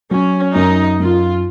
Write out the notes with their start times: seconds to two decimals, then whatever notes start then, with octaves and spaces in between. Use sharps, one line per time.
0.11 F#3 C#4
0.55 F#2 D#4
1.00 F#2 F4